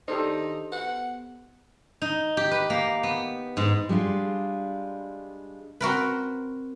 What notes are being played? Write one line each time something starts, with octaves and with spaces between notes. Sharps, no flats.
D#3 D4 D#4 G4 A4 C5
B3 F#5
D#4
G4
B4
A#3
B3
G#2
G3 G#3 D4 F4
C4 F#4 A#4 B4